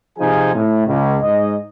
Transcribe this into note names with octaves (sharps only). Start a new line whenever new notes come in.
C3 F3 D#4 G#4 G#5
A2
C#2
G#2 D#5